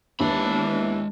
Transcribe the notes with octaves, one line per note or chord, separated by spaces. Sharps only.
D#2 E3 G#3 B3 D4 B5